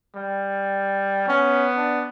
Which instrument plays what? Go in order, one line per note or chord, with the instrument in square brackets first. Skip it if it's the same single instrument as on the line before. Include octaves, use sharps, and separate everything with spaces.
[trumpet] G3
[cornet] B3 [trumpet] C#4
[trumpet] D4